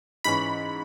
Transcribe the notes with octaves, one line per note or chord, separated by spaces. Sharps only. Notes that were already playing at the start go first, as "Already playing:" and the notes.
G#2 E3 C#4 B5